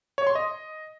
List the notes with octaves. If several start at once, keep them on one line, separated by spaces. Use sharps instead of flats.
C#5
C6
D#5